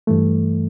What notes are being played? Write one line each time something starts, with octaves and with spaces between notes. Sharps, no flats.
G2 E3 A3